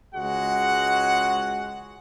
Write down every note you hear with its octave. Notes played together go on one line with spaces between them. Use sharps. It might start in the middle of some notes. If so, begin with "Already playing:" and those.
C#2 G#3 F#4 F#5